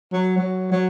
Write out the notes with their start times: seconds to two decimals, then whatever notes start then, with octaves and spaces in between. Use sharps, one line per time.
0.12 F#3
0.37 F#3
0.72 F#3